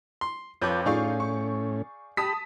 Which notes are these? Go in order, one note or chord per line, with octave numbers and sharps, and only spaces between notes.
C6
F2 F4 B4 C#5 A5 D6 G6
A2 C#4 D#4 F4 G#4 D5 F5 C#6
C#6
G4 A5 B5 D#6 B6